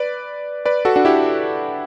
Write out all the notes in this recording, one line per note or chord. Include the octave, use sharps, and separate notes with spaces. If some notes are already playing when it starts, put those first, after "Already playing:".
Already playing: B4 D5
B4 D5
F#4 A4
D4 F#4
E4 G4